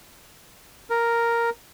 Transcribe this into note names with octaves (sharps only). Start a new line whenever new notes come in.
A#4